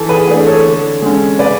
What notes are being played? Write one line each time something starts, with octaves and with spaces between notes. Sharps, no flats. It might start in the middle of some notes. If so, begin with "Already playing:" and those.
Already playing: E3 A4
G#4 B4
A3 D4 G#4 B4
A4 C#5
D3
G#3 C#4
C#3 B4 D5